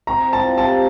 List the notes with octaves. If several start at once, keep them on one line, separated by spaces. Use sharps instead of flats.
C4 A#5
F4 A5
C3 A5